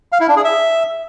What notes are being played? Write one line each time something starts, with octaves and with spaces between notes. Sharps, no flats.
F5
E4
D4
G#4
E5